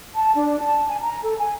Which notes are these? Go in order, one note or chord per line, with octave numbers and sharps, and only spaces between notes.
A5
D4
A5
G#5
A#5
A4
G#5